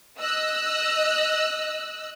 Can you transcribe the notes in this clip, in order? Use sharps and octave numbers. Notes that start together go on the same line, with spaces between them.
D#5 E6 F#6